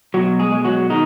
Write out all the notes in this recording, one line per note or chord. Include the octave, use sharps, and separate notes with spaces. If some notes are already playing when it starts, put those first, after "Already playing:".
B2 F#3 F#4
G#3 G#4
G#3
F#3 F#4
D#3 G#3 D#4